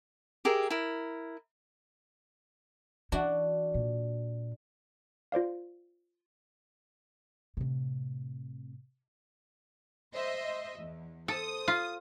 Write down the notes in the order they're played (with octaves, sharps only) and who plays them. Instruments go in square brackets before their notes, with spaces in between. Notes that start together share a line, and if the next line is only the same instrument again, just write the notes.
[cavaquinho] G4 G#4 A#4 E5
E4 A#4
[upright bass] E3 [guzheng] D4 F#4
[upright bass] A#2
[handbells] F4 C5 D5 F5
[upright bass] A2 C3
[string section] C5 D#5 E5
E2
[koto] A4 [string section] C5 D#6
[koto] F4